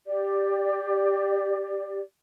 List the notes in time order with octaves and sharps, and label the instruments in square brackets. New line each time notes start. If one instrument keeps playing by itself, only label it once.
[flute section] G4 D5